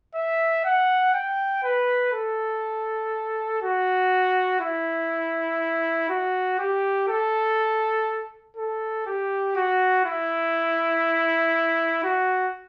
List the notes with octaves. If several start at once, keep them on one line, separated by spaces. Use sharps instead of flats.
E5
F#5
G5
B4
A4
F#4
E4
F#4
G4
A4
A4
G4
F#4
E4
F#4